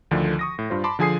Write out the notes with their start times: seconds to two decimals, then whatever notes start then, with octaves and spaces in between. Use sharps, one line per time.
0.11 D2 D3 D#3 F3
0.39 C#6 D#6 A#6
0.59 A2
0.70 G2 F4 C5
0.84 A5 B5 C6 D6
0.99 D3 F3 G#4 G#5 D#6 C7